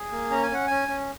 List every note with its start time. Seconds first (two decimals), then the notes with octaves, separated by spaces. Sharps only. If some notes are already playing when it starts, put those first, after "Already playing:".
Already playing: G#4
0.11 A#3
0.30 C#4 A#5
0.43 G#5
0.51 C#4 F#5
0.67 C#4 G#5
0.89 C#4